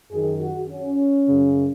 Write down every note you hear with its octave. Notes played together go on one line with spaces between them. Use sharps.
F#2 D#3 G#4
F#4
C#4
F#2 C#3